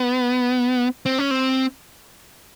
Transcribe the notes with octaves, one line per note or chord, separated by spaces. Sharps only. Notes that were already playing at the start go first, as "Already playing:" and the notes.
Already playing: B3
C4
C#4
C4